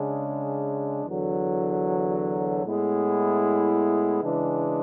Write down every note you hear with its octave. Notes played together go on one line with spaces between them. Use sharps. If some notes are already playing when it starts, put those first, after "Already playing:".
Already playing: C#3 G#3 D4
E2 D3 F#3
A2 G#3 B3 E4
C#3 E3 G#3 D4